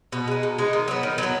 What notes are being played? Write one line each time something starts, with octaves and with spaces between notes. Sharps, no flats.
B2
G#3 D#4
B2
G#3 D#4
D#3
F#3 B3
D#3
F#3 B3